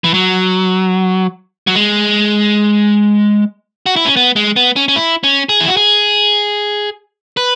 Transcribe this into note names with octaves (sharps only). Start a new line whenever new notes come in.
E3
F#3
F#3
G#3
F#4
E4
C#4
B3
G#3
B3
C#4
C#4
E4
C#4
G#4
E4
F#4
G#4
B4